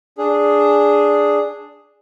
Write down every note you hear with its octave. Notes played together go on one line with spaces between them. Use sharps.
D4 G#4